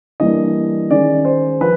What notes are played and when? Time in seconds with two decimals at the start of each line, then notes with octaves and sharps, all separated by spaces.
0.20 E3 G3 A#3 D4 D#5
0.90 D#3 G#3 C#4 D5
1.25 C5
1.61 F3 B4